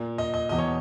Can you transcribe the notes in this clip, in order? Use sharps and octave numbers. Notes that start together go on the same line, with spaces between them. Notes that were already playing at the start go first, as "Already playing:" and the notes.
Already playing: A#2
D#5
D#5
E2 B2 D#5
C#5